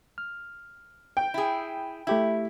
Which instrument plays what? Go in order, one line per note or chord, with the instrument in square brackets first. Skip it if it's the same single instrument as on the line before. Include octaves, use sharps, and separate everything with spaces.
[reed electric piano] F6
[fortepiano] G5
[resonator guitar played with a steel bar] E4 G#4
[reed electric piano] A3 G4 E5 [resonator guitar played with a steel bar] E4